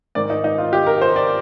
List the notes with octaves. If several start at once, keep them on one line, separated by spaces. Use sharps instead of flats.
G#2 D#3 D5
D#4
D#4
F4
G4
A#4
C5
D5